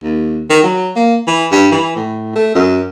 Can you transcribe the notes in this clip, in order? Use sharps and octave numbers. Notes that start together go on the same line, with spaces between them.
D#2
D#3
F#3
A#3
E3
G2
E3
A2
A3
F#2